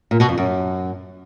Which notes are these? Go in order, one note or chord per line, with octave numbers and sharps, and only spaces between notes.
A#2
B2
F2
F#2